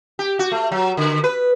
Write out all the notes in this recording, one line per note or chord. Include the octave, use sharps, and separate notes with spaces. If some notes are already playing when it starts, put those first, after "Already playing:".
G4
F#4
A3
F#3
D3
B4